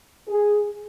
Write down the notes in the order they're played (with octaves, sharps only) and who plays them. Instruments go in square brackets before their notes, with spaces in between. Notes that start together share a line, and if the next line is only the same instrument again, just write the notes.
[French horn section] G#4